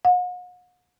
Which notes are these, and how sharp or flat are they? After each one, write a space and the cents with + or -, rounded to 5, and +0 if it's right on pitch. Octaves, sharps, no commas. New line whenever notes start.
F#5 -45